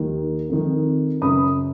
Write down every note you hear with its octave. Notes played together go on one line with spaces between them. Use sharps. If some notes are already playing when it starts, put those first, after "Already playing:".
Already playing: D#2 D#3
F2 D#3
F#2 C#3 B5 D#6